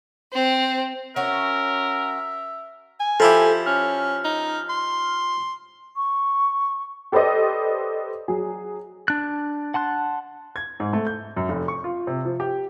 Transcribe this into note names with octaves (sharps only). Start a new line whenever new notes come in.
C4
C#4 F#4 A#4 E5
G#5
F3 E4 G4 A4
C#4 F6
D#4
C6
C#6
G4 A4 B4 C5 D5 D#5
F#3 G#4
D4 F#6
F#5 A5 C6 F#6
G#6
G#2
A3
G6
F#2
F1
C#6
F4
C3
F3
G4